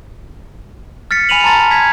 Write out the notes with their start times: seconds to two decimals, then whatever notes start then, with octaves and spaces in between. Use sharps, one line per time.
1.11 F6 A6 B6 C#7
1.29 G#5 B5 D#7 F7 F#7
1.44 A5 A#5 C6 A6
1.71 G#6 B6